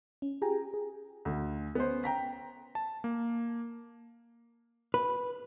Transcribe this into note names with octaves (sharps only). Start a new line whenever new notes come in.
C#4
F4 G4 G#4 G5 G#5 A#5
G#4
D2
B3 C#4 C5
G5 A#5 B6
A5
A#3
B4